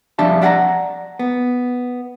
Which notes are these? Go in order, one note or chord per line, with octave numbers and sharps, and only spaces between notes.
F2 G3 D4 E5 A5
D5 E5 F#5 G5 A5 A#5
B3